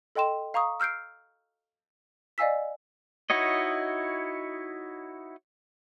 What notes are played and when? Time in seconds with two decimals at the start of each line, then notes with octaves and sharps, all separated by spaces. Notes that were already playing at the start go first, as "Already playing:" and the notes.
0.15 A4 D#5 G5 C6 E7
0.54 F5 A#5 C#6 D#6
0.80 E6 F6 G6 C7 D7
2.38 D5 D#5 F5 G#5 E6 B6
3.30 D#4 E4 F#4 C#5 D#5